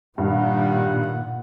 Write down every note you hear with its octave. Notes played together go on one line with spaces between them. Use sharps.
G2 A#2 D#3 G3 F#5